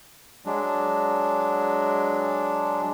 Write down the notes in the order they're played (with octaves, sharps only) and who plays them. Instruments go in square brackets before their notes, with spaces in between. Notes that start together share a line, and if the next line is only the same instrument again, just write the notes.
[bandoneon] F#3 G#3 D4